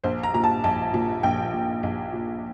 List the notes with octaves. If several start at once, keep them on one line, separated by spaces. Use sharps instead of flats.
A#1 C5
A#5
A#2 A#5
A5
A#1 A5
A#2
A#1 G5
A#2
A#1
A#2